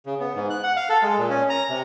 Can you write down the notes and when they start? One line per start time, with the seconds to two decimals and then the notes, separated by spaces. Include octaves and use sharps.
0.06 C#3
0.20 B3
0.35 G#2
0.50 F#6
0.63 F#5
0.76 F5
0.89 A4
1.03 G#3
1.18 A#2
1.30 C#4
1.50 A#5
1.69 C3